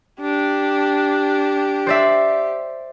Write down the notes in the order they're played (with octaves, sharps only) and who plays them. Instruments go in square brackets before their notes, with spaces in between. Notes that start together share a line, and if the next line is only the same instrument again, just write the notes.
[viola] D4 [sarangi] G4
[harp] C5 D5 E5